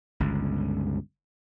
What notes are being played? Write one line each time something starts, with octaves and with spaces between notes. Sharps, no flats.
G1 C#2